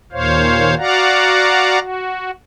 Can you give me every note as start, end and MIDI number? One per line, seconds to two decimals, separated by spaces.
0.12 0.75 39
0.12 0.75 46
0.12 0.75 72
0.12 0.75 73
0.12 0.75 77
0.78 1.79 66
0.78 1.79 74
0.78 1.79 77
0.78 1.79 78
0.78 1.79 82
1.80 2.31 66